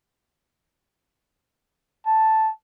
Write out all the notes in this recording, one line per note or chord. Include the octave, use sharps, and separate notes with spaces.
A5